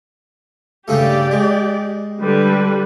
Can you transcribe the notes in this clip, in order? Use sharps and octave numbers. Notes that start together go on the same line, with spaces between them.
G2 C#3 A3 G4 D5
G#3
D3 G3 B4